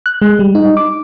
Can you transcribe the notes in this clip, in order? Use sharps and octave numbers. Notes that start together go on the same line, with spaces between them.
F#6
G#3
G3
D#4
D6